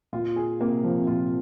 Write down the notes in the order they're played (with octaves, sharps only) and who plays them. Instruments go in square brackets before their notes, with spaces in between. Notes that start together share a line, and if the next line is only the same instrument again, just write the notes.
[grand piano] A#2 [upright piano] F4
[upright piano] G#4
[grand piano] C3 [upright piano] A#3
[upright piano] F3
[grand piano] C3
[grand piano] A#2 [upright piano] F4